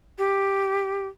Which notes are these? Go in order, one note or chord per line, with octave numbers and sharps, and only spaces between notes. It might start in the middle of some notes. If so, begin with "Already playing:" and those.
G4